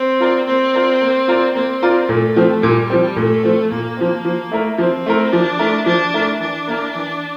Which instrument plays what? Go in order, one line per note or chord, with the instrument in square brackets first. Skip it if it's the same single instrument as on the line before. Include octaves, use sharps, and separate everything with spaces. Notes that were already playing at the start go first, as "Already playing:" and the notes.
Already playing: [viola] C4
[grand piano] F4 A#4 D5
[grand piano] A#3 [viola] C4
[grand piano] F4 A#4 D5
A#3
F4 A#4 D5
[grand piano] A#3 [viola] C4
[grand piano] F4 A#4 D5
[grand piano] A#2 [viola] A3
[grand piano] F3 C4
[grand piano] A#2 [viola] G3
[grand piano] F3 C4
[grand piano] A#2 [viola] A3
[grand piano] F3 C4
[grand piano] A#2 [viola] A#3
[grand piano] F3 C4
F3
A3 E4 A#4
[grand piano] F3 [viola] C4
[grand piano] A3 E4 A#4
[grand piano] F3 [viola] D4
[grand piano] A3 E4 A#4
[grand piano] F3 [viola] D4
[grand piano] A3 E4 A#4
[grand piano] E3 [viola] D4
[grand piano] A#3 E4 A#4
E3